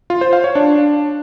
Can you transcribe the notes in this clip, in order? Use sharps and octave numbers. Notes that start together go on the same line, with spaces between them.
F4
C5
F5
C#5
D4